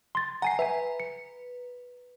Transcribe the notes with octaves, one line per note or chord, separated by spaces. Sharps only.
C6 A6
F#5 G#5 A#5 C7
B4 E5 G#5
C#7